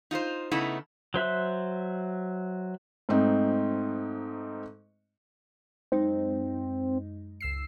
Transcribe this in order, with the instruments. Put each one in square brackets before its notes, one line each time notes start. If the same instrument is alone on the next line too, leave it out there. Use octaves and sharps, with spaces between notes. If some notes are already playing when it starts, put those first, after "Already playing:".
[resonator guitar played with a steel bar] D#4 F4 B4 C5
C#3 A3 B3 D#4 E4
[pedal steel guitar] F#3 C5 E5 F#6
[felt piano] G#2 A3 C4 D#4
[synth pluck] F#2 G#3 D#4 [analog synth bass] C4
[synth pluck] C#2 E6 C7